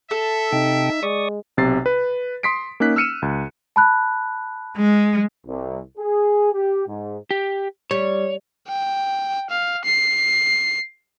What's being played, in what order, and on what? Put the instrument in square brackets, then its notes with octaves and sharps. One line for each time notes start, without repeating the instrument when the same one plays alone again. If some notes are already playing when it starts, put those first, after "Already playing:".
[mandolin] A4 [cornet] E5
[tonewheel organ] C3 G5 [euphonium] D#4
[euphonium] G#3 [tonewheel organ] D5 C#6 D#6
[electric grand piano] B1 C3 A6 C7
B4
C6 D#6 B6 C7 D7
A#3 C#4 D#4 F#6 B6
E6 F6 C#7 D#7 E7
C#2
[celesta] A5 B5 F#6
[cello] G#3
[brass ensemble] C2
G#4
G4
G#2
[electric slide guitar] G4
[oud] G3 [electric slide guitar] C#5
[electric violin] G5
F5
C7